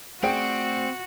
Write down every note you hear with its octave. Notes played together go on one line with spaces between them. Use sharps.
A3 C4 F#4 G#4 C5 D5 G5 D7